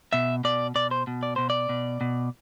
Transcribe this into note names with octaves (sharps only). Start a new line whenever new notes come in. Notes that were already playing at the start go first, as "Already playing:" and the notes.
B2 E5
B2 D5
B2 D5
C5
B2
D5
B2 C5
D5
B2
B2